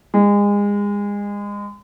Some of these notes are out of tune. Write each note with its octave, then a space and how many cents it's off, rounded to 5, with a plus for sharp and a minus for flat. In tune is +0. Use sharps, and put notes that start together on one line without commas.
G#3 -30